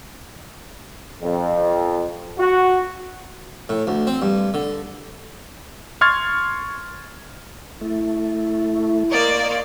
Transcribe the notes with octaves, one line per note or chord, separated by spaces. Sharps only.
F2
F#4
A2
D2
C4
G2
D3
C6 C#6 F6 G#6 A6
A3 E4
A#3 D5 D#5 C6 C#6